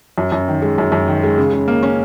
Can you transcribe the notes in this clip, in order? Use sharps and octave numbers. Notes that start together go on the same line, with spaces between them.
F#2
F#2
D#3
G#3
F#2
F#2
D#3
G#3
C#3
C#3
A#3
C#4